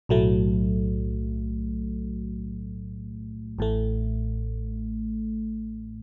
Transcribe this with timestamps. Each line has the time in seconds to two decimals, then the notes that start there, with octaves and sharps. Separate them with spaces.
0.09 B1 A2 F#3 A3
3.59 A1 A2 A3